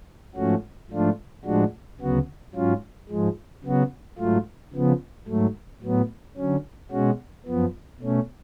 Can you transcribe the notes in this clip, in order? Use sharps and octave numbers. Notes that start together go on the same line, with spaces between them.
G#2 F3 A3 C#4 F#4
G#2 F3 A3 D4 F4
A2 F3 G#3 D4 F#4
D2 C#3 F#3 B3 F#4
G#2 F#3 C#4 F4
G#2 F3 G#3
C#3 F#3 B3 F#4
G#2 F#3 A3 F4
C#3 F3 B3
G#2 F#3 A3
A2 F#3 B3
D3 F#3 C#4
B2 G#3 C#4 F#4
F#2 F3 B3
B2 A3 C#4